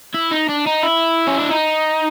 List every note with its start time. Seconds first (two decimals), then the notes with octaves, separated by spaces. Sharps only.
0.14 E4
0.31 D#4
0.49 D4
0.66 D#4
0.83 E4
1.28 C#4
1.40 D4
1.51 D#4